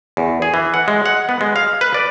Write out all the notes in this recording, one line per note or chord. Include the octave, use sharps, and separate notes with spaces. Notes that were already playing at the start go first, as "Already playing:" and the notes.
E2
G#4
E3
F#5
G#3
F#5
B3
G#3
F5
B4
D5